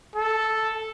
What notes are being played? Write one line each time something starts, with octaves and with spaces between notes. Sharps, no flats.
A4